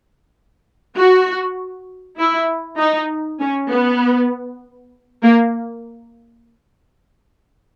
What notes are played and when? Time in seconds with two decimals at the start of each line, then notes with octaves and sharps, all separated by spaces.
0.97 F#4
2.19 E4
2.79 D#4
3.40 C#4
3.71 B3
5.23 A#3